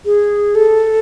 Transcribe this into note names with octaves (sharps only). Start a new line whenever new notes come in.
G#4
A4